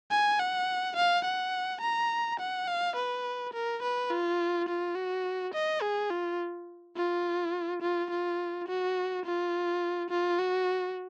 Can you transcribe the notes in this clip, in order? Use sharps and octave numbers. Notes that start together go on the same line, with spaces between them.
G#5
F#5
F5
F#5
A#5
F#5
F5
B4
A#4
B4
F4
F4
F#4
D#5
G#4
F4
F4
F4
F4
F#4
F4
F4
F#4